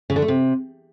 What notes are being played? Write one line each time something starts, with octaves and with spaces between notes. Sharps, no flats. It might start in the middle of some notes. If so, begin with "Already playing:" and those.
C#3
D3
A3
C3